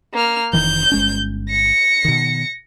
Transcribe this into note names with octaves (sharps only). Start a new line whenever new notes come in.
A#3 F6
F1 D#3 E3 G6
G1 G#3 C#4
A#6 C#7
B2 D#3